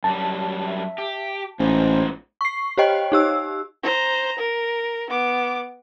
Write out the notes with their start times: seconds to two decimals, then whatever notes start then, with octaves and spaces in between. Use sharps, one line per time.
0.04 F#2 G3 A5
0.66 E5
0.98 G4
1.59 A1 G#2 B3 D#4 C5
2.41 C#6 C7
2.77 G4 C5 C#5 D#5 G5
3.12 D#4 G4 E6
3.83 C5 A#5
4.38 A#4
5.10 B3 D6